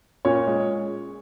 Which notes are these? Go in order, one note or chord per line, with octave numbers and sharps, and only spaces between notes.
A#2 C#4 C#5
G#3